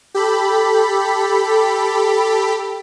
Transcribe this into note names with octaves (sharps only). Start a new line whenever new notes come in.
G4 A4 B5